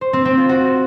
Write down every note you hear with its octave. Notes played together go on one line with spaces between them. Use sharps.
C5
C4
C4
F4
F#4